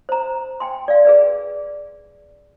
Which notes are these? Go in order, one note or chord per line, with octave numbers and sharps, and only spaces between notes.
C5 A#5
G5 G#5 C6
D5 F5
G#4 B4 D5